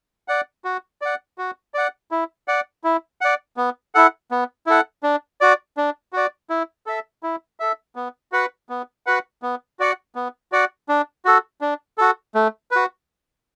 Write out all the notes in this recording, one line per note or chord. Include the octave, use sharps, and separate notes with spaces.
D5 F#5
F#4
D5 F#5
F#4
D5 F#5
E4
D5 F#5
E4
D5 F#5
B3
E4 A4 F#5
B3
E4 A4 F#5
D4
F#4 D5
D4
F#4 D5
E4
A4 E5
E4
A4 E5
B3
F#4 B4 F#5
B3
F#4 B4 F#5
B3
F#4 D5 F#5
B3
F#4 D5 F#5
D4
F#4 A4
D4
F#4 A4
A3
F#4 B4